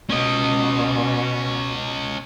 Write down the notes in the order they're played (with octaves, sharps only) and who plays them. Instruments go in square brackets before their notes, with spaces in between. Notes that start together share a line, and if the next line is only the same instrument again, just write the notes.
[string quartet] B2 [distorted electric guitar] C#4 D#5